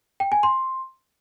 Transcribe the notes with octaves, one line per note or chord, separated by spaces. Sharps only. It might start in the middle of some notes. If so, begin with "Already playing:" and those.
G5
G#5
C6